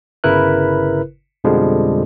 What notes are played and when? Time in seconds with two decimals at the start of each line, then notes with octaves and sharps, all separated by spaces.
0.24 G1 C#3 E4 A#4 B4 F#6
1.44 F2 B2 D3 F3 G3 G#3